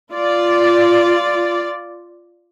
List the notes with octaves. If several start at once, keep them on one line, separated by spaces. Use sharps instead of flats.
F4 D5